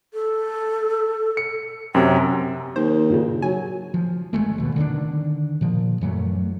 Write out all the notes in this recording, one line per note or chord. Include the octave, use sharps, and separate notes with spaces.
A4
C#7
F#2 C3 G5
D#2 C5
G2 A#2 C#3
F#3 G#5
F3
G#1 F2 G#3 A3
D#2 B2
D3 D#3 C4 D4
A#2 F3
F#2 E3 F#3 A3